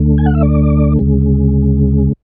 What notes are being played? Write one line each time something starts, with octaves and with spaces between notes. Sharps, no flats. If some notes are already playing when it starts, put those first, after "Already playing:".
Already playing: D2 D3 A3
G#5
F#5
E5
D5
D2 C#3 G#3